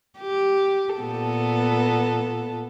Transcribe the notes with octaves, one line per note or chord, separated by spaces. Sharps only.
G4
A#2 B3 A4